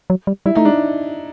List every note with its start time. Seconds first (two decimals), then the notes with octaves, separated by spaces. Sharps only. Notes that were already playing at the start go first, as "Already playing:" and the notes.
0.10 F#3
0.27 G3
0.46 G3 E4
0.55 A3 D#4
0.65 G#3 D4